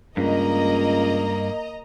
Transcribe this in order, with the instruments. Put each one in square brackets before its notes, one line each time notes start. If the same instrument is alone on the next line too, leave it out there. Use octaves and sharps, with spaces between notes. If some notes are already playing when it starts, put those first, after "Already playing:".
[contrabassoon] C#2 [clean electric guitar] G2 [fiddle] A#3 [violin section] D#5 A#5